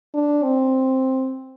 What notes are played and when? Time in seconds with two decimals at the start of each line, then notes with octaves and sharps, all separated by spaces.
0.14 D4
0.43 C4